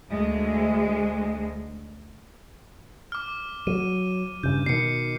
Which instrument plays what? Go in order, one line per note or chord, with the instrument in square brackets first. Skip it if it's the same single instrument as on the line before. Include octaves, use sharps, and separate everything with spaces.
[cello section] D2 G#3
[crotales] D6 F6
[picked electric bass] F#3 [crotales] D#7
[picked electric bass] G2 C#3 [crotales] G6
[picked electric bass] B2 D#3 [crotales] C7 C#7